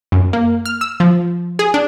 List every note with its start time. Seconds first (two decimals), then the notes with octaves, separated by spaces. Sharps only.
0.12 F#2
0.33 A#3
0.66 F6
0.81 E6
1.00 F3
1.59 G#4
1.74 D4